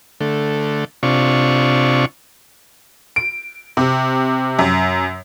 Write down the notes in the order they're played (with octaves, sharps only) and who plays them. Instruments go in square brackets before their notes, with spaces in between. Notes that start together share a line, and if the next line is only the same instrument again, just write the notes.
[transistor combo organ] D3 A3
C3 D4 F4 C#6
[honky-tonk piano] D7
C3
F#2